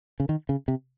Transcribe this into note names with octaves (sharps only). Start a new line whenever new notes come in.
C#3
D#3
C#3
C3